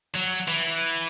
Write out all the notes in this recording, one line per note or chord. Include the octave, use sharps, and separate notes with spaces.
F#3
E3